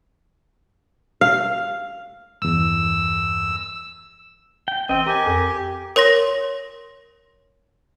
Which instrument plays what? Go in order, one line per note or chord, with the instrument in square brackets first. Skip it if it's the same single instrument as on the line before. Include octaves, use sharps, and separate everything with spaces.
[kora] F5
[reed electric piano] E2 G2 [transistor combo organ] E6
[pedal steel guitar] G5
[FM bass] A1 [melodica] C4 [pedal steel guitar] D#5 G5
[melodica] G4 [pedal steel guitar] A#4 G#5
[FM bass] F2
[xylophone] A#4 C#5 C6 A#6